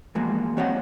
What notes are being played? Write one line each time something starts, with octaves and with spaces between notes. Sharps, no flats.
E3 F3 G#3 A#3 B3 F#4
C4 F#4 C#5 D#5 F5 F#5